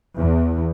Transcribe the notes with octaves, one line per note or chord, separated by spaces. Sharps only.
E2